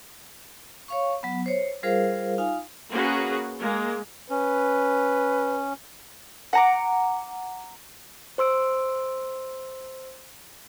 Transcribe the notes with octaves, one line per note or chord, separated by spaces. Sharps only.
C#5 F5 C#6
F#3 B3
C5 C#5
G3 F4 G#4 A#4 C5 F5
D#4 F4 F5 G#5
A#3 C#4 F#4 G#4 B4
G#3 A#3
C#4 B4
F#5 A#5 D6
C5 C6 E6 D7